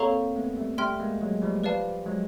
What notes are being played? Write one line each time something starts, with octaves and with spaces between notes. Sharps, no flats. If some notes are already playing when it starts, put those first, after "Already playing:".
Already playing: A#3 C4 A4 C#5 F5 A#5 C#6
A3 B3
G3 A3
G3 A3 E5 G5 C6 F6
G#3 A#3
F#3 G#3
F3 G3
F3 G3 B4 D5 F5 A5
F#3 G#3